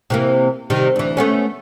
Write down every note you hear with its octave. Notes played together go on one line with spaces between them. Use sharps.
C3 E3 A#3
C3 D#3 G3
D2 E3
A3 B3 C#4